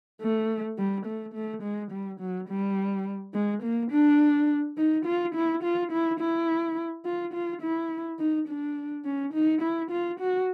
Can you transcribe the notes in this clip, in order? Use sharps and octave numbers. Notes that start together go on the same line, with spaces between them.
A3
G3
A3
A3
G#3
G3
F#3
G3
G#3
A#3
D4
D#4
F4
E4
F4
E4
E4
F4
F4
E4
D#4
D4
C#4
D#4
E4
F4
F#4